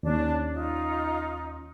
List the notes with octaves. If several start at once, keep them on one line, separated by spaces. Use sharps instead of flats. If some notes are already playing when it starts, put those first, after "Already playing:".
D#2 C#4 D4
D#4 F4